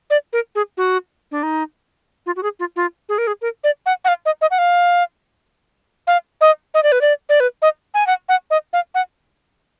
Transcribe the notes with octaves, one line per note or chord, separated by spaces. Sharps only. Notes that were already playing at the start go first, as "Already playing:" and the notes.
D5
A#4
G#4
F#4
D4
D#4
F4
F#4
G#4
F4
F4
G#4
A#4
G#4
A#4
D5
F#5
F#5
F5
D#5
D#5
F#5
F5
F5
D#5
D#5
D5
B4
D5
D5
B4
D#5
G#5
F#5
F#5
D#5
F5
F#5